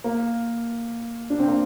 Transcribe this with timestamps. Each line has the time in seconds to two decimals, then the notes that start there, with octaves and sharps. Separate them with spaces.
0.04 A#3
1.30 D4
1.39 C4
1.47 A#3